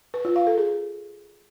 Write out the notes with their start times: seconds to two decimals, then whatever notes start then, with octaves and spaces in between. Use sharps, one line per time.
0.14 B4
0.25 F4
0.36 F5
0.47 A4
0.58 G#4